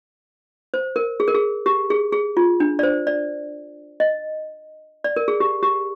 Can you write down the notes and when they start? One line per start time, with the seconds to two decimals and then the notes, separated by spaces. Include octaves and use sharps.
0.74 C5
0.96 A#4
1.20 G#4
1.28 A#4
1.34 G#4
1.66 G4
1.90 G#4
2.12 G#4
2.37 F4
2.60 D4
2.79 D5
2.83 C5
3.07 D5
4.00 D#5
5.04 D5
5.16 A#4
5.28 G#4
5.40 G4
5.63 G4